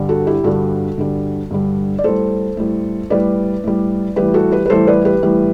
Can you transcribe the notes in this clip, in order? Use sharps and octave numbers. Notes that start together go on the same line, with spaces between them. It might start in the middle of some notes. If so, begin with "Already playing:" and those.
Already playing: G2 D3 G3
F#4 A4
E4 G4
G2 D3 G3 F#4 A4
G2 D3 G3
G2 D3 G3
D5
A2 G3 A4 C5
A2 G3
A2 G3 B4 D5
A2 G3
A2 E3 G3 G4 B4
F#4 A4
G4 B4
B4
A2 E3 G3 A4 C5
B4 D5
G4 B4
A2 E3 G3